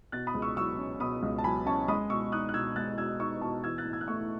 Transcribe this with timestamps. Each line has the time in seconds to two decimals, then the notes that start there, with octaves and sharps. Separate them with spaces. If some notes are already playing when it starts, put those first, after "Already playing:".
0.12 B2 F#6 A6
0.27 B5 D#6
0.35 C#2
0.42 C#6 E6
0.57 F#3 C#6 E6
0.78 C#4
1.00 B2 B5 D#6
1.23 C#2
1.38 A5
1.44 F#3 G#5 B5
1.66 C#4 A5 C#6
1.88 G#3 B5 D#6
2.10 B2 C#6 E6
2.32 D#4 D#6 F#6
2.49 F#6
2.54 B2 E6 G#6
2.76 G#3 F#6 A6
2.98 B2 E6 G#6
3.20 D#4 C#6 E6
3.41 B2 A5 C#6
3.64 E3 E6 G#6
3.78 F#6 A6
3.85 A2
3.93 E6 G#6
4.01 F#6
4.07 A3 C#6 E6